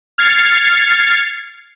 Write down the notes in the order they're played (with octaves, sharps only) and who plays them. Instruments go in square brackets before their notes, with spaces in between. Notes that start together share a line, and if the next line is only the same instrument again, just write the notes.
[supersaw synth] F6 G#6 A6 C7 C#7